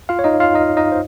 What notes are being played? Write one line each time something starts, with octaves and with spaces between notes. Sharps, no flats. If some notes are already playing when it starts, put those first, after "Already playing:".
F4 F5
C#5
D#4 D#5
F4 F5
D#4 D#5
D#4 D#5
C5